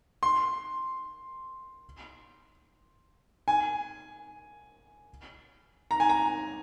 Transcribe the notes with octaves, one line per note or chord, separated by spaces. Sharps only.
C6
G#5
A#5
G#5
A#5